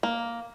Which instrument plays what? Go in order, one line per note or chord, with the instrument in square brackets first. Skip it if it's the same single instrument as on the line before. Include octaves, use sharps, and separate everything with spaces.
[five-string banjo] A#3